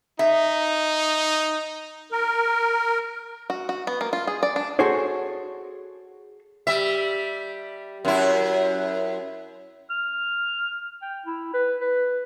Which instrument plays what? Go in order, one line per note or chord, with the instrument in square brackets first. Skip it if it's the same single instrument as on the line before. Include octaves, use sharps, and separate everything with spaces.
[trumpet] D#4 [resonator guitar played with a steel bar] E5
[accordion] A#4
[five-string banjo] F#4
F#4
B3
A#3
F4
G#4
D5
D4
[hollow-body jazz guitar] F#4 G#4 A4 C5 C#5
[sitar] G3 E5
F#2 E4
[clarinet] F6
G5
E4
B4
B4